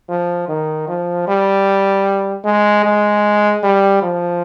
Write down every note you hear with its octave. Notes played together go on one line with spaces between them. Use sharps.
F3
D#3
F3
G3
G#3
G#3
G3
F3